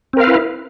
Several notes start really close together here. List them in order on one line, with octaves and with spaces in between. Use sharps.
C4 A#4 F5 B4 E4